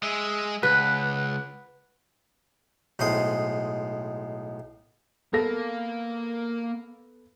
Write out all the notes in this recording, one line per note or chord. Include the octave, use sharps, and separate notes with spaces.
G#3 G#4 E5
C#2 B4 F#5
B1 A2 G#3 C5 D#6
A#3 B3 A4 A#6